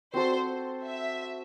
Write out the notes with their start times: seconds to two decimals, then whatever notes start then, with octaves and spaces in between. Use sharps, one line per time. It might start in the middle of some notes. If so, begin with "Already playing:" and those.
0.14 C4 F#4 A4 C5
0.84 E5